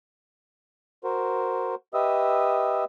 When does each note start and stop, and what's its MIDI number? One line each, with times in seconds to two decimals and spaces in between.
1.04 1.75 66
1.04 1.75 70
1.04 1.75 72
1.94 2.84 67
1.94 2.84 71
1.94 2.84 75
1.94 2.84 76
1.94 2.84 87
1.94 2.84 88